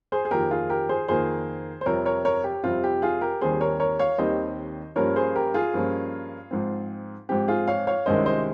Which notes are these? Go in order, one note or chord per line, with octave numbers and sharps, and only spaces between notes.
G#4 C5
G#4
F2 D#3 A#3 G4 A#4
F4 G#4
G4 A#4
G#4 C5
F2 D#3 A#3 G#4 C5
C5
F2 C3 G3 C4 A#4 C#5
A#4 C#5
A#4 C#5
G4
F2 C3 G3 C4 F4
G4
F4 G#4
G4 A#4
D#2 D#3 G3 C4 G#4 C5
A#4 C#5
A#4 C#5
C#5 F5
D#2 D#3 G3 C4 C5 D#5
G2 F3 A#3 C#4 A#4 C#5
G#4 C5
G4 A#4
F4 G#4
G2 F3 A#3 C#4
G#2 F3 C4
G#2 F3 C4 G4
F4 G#4
C#5 F5
C#5 F5
C2 C3 D#3 G#3 C#4 C5 D#5
C5 D#5